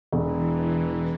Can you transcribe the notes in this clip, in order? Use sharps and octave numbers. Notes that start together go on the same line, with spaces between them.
E1 E3